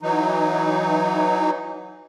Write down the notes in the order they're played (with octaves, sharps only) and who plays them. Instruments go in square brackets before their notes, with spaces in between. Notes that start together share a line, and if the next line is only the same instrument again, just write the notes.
[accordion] E3 F#3 D#4